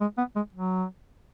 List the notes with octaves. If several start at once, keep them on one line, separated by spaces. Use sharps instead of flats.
G#3
B3
G#3
F#3